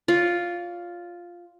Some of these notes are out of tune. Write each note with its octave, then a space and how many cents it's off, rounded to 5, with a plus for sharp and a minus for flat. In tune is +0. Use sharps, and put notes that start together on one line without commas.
F4 +0 C#5 +40